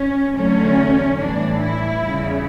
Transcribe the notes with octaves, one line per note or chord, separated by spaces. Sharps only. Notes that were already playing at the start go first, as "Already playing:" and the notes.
Already playing: C#4
E2 D3 F#3 A3 C#4
A2 E3 G3 D4
E4
E2 C#3 G3